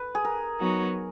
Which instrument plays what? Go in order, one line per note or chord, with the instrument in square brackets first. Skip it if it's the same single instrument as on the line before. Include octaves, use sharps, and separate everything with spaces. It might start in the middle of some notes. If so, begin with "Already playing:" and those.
Already playing: [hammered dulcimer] B4
G#4
A#4
[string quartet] F#3 B3 D#4 F#4 C#5